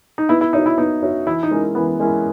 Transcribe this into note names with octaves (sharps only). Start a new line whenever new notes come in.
D#4
B3 E4
E4
D#4 F#4 C#5 E5
E4
B3 D#4
F#4 C#5 E5
E3 E4
D#4
G#3 C#4 E4 A#4
E3 B3
G#3 C#4 E4 A#4